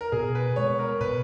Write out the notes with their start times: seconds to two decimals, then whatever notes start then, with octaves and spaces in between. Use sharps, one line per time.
0.01 A#4
0.12 B2 G#4
0.35 B4
0.56 G#3 B3 C#5
0.79 A#4
1.01 B2 B4